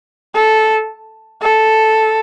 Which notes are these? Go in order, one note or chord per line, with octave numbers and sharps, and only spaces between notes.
A4
A4